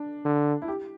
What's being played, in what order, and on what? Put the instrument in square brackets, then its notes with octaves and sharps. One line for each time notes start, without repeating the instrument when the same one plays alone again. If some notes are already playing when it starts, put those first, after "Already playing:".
Already playing: [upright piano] D4
[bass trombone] D3
[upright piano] E4
G4